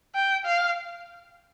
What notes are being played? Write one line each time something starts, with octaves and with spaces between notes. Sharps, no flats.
G5
F5